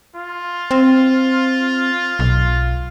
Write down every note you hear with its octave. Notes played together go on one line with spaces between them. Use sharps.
F4
C4
B1